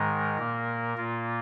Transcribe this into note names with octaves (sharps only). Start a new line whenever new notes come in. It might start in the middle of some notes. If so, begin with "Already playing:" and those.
Already playing: G#2 D#3 G#3 A#4
A#2 A#3
A#2 A#3 F4